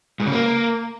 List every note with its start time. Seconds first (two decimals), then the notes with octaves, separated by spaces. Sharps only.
0.20 G#2
0.26 C#3
0.32 A#3